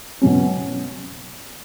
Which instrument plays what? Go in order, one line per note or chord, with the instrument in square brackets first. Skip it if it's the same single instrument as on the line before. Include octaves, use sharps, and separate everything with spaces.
[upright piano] B2 F#3 C#4